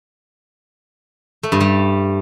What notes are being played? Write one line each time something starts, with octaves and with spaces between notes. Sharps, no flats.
A3
G2
G3